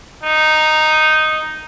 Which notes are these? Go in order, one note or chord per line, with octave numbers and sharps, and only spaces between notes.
D#4